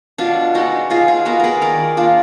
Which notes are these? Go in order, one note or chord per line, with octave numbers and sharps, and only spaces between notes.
B2 D4 F4
G#3 B3 D#4 F#4
B2 F4 G#4
F4 G#4
G#3 B3 F#4 A#4
G#4 A#4 B4
D#3 A#4 D5
A#3 D4 F4